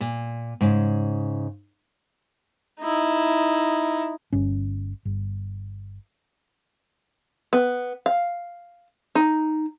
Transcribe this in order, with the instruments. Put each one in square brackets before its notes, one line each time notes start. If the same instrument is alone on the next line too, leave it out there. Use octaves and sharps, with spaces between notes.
[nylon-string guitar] A#2
G#2 C#3
[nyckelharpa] D#4 E4
[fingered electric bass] G1 C#4
G1
[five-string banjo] B3
F5
D#4